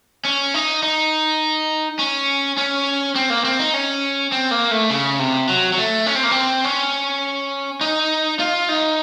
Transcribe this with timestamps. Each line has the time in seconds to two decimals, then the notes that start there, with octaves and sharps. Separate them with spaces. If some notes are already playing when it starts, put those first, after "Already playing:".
0.25 C#4
0.54 D#4
0.83 D#4
1.99 C#4
2.58 C#4
3.15 C4
3.30 A#3
3.44 C4
3.59 D#4
3.74 C#4
4.32 C4
4.51 A#3
4.71 A3
4.90 C#3
5.19 C3
5.49 F#3
5.73 F#3
5.78 A3
6.06 C#4
6.15 C4
6.23 A#3
6.31 C4
6.65 C#4
7.81 D#4
8.39 F4
8.69 D#4